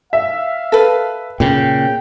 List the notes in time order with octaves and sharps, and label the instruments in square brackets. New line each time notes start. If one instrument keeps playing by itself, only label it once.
[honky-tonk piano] E5 [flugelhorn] F5
[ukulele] A4 B4
[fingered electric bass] A#2 C#3 [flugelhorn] G5